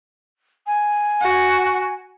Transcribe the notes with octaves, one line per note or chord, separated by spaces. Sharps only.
G#5
F#4